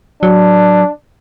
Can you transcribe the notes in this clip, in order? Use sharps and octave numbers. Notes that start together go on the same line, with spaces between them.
F#3 D4